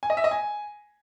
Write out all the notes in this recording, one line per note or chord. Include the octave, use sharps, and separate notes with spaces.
G#5
D#5
E5
D#5
G#5